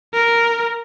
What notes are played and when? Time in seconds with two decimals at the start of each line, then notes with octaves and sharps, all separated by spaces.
0.13 A#4